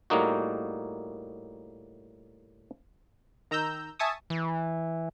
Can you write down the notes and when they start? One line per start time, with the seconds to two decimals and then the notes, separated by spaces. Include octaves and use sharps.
0.10 A2 G3 A#3 D#4 F#4
3.51 D#3 A#5 E6 G6
3.99 E5 G#5 A5 C#6 D#6
4.30 E3